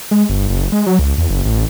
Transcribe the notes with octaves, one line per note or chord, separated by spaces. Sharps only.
G#3
G1
F#1
G#3
F#3
C#2
E2
F#1
A1